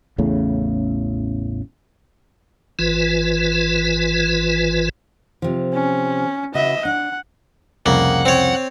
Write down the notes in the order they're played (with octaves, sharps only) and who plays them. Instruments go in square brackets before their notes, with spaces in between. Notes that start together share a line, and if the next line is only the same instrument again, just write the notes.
[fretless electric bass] A1 E2 A2 C#3
[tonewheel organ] G#1 E3 F4 B4
[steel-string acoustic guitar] C3 F3
[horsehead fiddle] C#4
[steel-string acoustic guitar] C#3 F#4 B4 [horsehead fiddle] D#5 E5
[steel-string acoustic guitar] D4 [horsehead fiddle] F#5
[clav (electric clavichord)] C2 F2 C#3 [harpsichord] A#3 [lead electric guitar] F#5
[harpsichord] C4 C#5